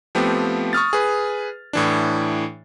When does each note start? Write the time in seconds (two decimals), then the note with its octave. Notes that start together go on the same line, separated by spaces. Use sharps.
0.15 F3 A3 B3 C4 G4
0.73 C#6 D#6 F6 A6
0.93 G#4 B4
1.73 A2 E3 D4